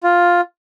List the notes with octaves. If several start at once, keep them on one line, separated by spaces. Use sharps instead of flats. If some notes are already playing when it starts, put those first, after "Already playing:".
F4